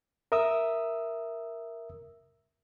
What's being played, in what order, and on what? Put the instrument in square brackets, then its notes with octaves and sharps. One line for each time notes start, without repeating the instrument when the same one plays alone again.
[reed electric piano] A#4 E5 D#6 E6